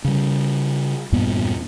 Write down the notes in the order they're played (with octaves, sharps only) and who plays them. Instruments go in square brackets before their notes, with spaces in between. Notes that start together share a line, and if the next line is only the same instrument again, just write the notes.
[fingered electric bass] C#3 G3
E2 G2 A#2 B3